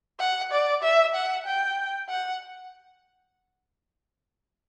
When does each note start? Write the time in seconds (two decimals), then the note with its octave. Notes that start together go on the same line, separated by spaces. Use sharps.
0.20 F#5
0.52 D5
0.83 E5
1.15 F#5
1.45 G5
2.09 F#5